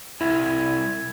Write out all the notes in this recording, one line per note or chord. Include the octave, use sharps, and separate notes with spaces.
C2 E4 G#5